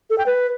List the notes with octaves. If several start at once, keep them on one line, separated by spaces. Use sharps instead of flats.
A4
G5
B4